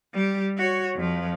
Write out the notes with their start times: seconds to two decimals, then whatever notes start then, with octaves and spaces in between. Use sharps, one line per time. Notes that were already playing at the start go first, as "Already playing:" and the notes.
0.14 G3 G4
0.57 F#4 C#5
0.96 F2 F3